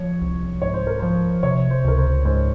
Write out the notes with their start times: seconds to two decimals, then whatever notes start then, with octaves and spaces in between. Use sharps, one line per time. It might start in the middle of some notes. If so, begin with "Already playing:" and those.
Already playing: F3 C#5
0.21 C2
0.62 G#2 C#5
0.74 C5
0.87 A#4
1.00 F3 C5
1.43 C3 C#5
1.71 C5
1.84 C#2 A#4
1.98 C5
2.25 G#2 C5